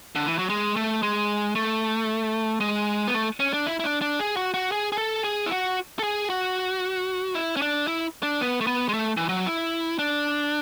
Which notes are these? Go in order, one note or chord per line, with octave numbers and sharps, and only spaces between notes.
D3
E3
F#3
G#3
A3
G#3
A3
G#3
B3
A3
C#4
D4
E4
E4
D4
D4
G#4
F#4
F#4
G#4
G#4
A4
G#4
E4
F#4
A4
G#4
F#4
E4
C#4
D4
E4
D4
B3
A3
B3
G#3
A3
E3
F#3
E4
D4